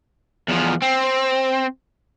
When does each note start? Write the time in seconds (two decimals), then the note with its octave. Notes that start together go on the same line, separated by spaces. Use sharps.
0.49 E2 F3
0.82 C4